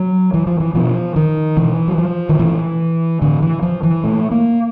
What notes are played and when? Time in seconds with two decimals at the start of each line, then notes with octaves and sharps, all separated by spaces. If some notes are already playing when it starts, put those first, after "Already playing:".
Already playing: F#3
0.34 E3
0.47 F3
0.60 E3
0.75 B2 F3
1.16 D#3
1.57 B2 E3
1.88 F#3
1.98 F3
2.29 D#3
2.39 A#2 E3
3.22 A2 D3
3.42 E3
3.63 F3
3.83 E3
4.04 A#2 A3
4.31 A#3